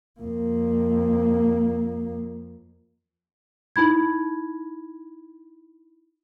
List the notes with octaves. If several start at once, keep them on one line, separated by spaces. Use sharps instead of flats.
F2 A#3
D#4 E4 B5 G#6